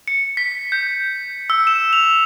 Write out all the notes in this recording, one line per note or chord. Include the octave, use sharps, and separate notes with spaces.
C#7
B6
G6
E6
E7
F7